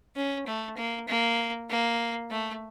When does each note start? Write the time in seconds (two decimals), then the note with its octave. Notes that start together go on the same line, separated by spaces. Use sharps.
0.16 C#4
0.47 A3
0.77 A#3
1.08 A#3
1.70 A#3
2.31 A3